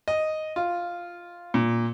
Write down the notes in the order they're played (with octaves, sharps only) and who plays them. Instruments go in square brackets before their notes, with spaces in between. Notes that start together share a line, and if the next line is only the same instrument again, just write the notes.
[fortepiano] D#5
F4
A#2